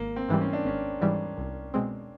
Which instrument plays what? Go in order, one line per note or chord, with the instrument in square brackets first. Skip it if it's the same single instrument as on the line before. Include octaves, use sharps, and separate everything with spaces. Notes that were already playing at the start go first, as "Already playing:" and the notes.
Already playing: [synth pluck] G#1 [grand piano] A#3
[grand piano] C4
[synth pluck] G#2 E3 G3
[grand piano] C#4
D4
[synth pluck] G#1 [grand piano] C#4
[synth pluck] G#2 E3 G3
C2
B2 G#3 C4